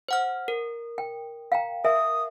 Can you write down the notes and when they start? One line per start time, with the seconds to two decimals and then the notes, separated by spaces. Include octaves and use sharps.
0.08 C5 F#5 F6
0.48 A#4
0.98 G5
1.52 F5 G5 A#5
1.85 A#4 E5 G#5 D#6